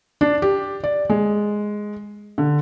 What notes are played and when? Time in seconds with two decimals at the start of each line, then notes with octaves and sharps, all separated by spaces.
0.21 D4
0.42 G4
0.84 D5
1.10 G#3
2.38 D3